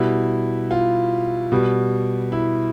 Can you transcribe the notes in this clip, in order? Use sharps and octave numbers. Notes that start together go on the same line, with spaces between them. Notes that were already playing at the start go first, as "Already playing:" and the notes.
Already playing: B2 G3 E4
F4
B2 G3
E4